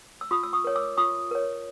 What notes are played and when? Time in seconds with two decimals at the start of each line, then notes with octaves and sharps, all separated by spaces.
0.21 E6
0.31 F4 C#6 D#6
0.43 E6
0.53 C#6 D#6
0.64 A#4 C#5
0.76 D6 E6
0.97 F4 C#6 D#6
1.31 A#4 C#5